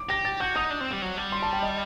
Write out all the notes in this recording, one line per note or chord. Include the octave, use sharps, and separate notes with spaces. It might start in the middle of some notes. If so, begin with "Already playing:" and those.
Already playing: D6
G4 A#6
A6
F#4 G6
D#4 D#6
D4
C4
G3
F#3
G3
C6
A5
G5
D#5